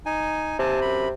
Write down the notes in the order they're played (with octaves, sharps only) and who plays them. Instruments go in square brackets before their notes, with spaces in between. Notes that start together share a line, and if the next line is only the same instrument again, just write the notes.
[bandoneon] D#4 G#5
[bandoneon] D#2 G#5 A5 [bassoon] C3
[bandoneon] F#2 B5